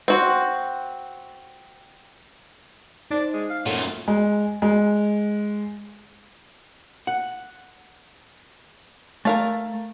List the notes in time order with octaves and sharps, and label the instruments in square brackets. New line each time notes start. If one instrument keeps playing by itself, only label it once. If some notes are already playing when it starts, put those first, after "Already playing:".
[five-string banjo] C4 F#4
[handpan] D#4 C5 [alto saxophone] D5
[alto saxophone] G#3
F5
[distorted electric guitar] F#2 A#2 [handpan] A#3 A4 F#5 [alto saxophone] C#5
[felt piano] G#3
G#3
[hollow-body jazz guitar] F#5
[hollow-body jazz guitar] A3 [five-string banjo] A#4 F5 A5